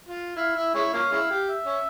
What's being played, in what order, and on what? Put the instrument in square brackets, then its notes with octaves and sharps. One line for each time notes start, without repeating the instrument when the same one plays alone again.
[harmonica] F4
[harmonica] E4 [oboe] F5
[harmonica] E4 [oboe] E5
[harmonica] G#3 C#4 E4 [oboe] C#5
[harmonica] F3 A#3 C#4 [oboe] F5
[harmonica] G#3 C#4 E4
G4
[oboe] E5
[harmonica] C#4